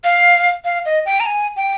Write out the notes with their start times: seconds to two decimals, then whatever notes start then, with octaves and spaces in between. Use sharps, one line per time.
0.04 F5
0.65 F5
0.86 D#5
1.06 G5
1.20 A#5
1.26 G#5
1.56 G5